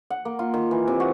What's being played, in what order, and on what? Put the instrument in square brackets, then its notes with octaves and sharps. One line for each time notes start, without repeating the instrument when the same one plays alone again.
[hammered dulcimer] F#5
A#3
F4
D#3
E3
C3
F#4